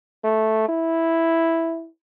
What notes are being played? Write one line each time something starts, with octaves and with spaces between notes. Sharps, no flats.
A3
E4